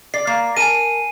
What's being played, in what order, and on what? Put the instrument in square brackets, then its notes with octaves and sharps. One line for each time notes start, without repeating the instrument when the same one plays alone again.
[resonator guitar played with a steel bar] D5 [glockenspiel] C7
[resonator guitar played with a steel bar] A#3 [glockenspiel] C7
[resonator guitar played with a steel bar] A#4 A5 [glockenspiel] G#5 D#7